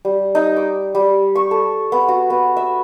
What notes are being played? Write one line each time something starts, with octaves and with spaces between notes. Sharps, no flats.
G3
D#4
D6
G3
C#6
A4
B3
F#4
B3
E5